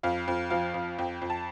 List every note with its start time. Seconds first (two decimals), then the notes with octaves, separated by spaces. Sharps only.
0.03 F2 F5
0.28 F2
0.50 F3 F5
0.74 F2
0.98 F2 G5
1.22 F2
1.30 A5